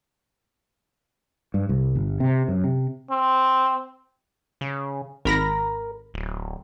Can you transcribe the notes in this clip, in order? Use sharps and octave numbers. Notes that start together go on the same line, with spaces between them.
G2
C2
G1
C3
F#2
C3
C4
C#3
G#1 A#4 B5 A#6
D1